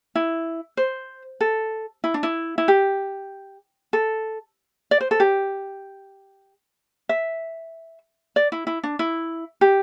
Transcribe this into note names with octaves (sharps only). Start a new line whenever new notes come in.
E4
C5
A4
E4
D4
E4
E4
G4
A4
D5
C5
A4
G4
E5
D5
E4
E4
D4
E4
G4